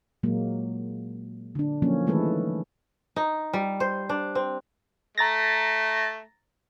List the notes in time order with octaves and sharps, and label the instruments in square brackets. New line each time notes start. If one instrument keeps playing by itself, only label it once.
[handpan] A#2 F#3 G#3 A#3
D3 D4
F3 F#3 A#3 C#4
D#3 E3 G#3 A3 A4 B4
[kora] D#4
G3
C5
D4
C4
[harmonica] A3 [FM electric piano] A#5 A6 A#6